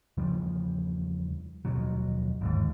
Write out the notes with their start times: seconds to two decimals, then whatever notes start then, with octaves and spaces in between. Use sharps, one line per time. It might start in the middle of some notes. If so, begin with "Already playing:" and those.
0.17 E2 C#3 F3 G3
1.65 D#1 F2 B2 F#3
2.41 G1 D#2 G#2